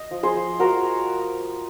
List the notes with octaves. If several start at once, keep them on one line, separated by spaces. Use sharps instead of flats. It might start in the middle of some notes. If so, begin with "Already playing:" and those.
Already playing: D#5
F3
G#4 C5
F3
F3 F#4 A#4